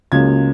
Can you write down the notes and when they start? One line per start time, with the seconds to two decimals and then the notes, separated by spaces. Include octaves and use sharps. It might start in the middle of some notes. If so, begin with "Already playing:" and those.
0.12 C#2 C#3 F#3 A#3 G#6